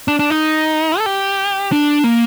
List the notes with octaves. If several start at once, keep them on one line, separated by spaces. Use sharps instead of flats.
D4
D4
D#4
A4
G4
D4
A#3